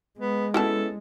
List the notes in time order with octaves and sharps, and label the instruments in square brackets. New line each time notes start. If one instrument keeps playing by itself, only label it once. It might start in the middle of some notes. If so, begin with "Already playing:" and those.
[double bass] G#3 [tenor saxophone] B3
[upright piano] B3 C#4 E4 [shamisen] F#4 C#5 A5 [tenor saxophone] A4